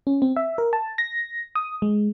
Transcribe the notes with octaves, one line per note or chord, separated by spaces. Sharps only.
C#4
C4
E5
A#4
A5
A#6
D#6
G#3